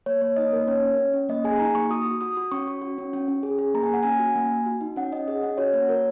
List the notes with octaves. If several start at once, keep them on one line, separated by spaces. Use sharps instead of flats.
A#3 C#5
A#3 C#5
D#4 D#5
A#3 A#4
C#4 C#5
C#4
C#4
C#4
A#3 D#5
G#4 G#5
D#4 A#5
A#3 C#6
F#4 D#6
F#4
F#4 D#6
F#4
C#4 C#6
F#4
F#4
C#4
C#4
C#4
G#4
G#4
A#3 A#5
G#5
A#3 F#5
C#4 G#5
F#4
A#3
F#4
F#4
D#4
C#4 F#5
C#4 D#5
G#4 D#5
C#4 F#5
F#4 C#5
A#3 C#5
F#4 A#4